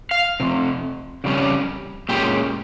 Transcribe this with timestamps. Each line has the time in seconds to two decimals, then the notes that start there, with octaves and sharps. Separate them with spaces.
0.11 F5
0.40 F2 C3
1.24 F2 C#3 G3 C#4
2.09 A#2 G#3 C#4 G4